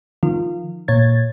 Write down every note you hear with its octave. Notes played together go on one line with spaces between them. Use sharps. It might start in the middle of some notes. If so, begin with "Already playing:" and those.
D#3 F3 F4
A#2 C#5 G#6 A6